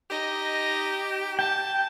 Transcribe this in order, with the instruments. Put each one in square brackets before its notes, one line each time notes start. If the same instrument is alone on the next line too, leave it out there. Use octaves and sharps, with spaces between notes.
[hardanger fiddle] D#4 D#5 [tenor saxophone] G4
[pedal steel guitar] G5 [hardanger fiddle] A5